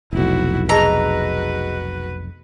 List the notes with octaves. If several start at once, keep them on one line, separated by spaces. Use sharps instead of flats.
F1 B1 E4 F#4
F#4 G#4 B4 D#5 A#5 E6